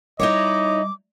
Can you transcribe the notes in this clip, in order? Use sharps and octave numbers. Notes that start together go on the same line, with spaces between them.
G3 D#4 E4 C#5 D#5 D6